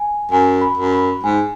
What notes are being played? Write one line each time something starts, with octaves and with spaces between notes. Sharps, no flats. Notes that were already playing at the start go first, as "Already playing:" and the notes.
Already playing: G#5
F#2 G#5
B5
F#2
B5
G#2 G#5